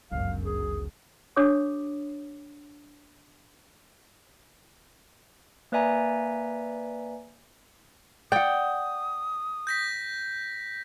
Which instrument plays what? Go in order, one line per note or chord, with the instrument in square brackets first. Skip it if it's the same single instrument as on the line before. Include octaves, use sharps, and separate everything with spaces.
[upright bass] G1 C#2 [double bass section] F#2 [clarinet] F5
[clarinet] G#4
[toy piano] D4 G4 C#5 D6 D#6
[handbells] A#3 B4 D5 E5 G#5 A#5
[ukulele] D5 F#5 [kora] G5 [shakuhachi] D#6
[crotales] G6 A#6 B6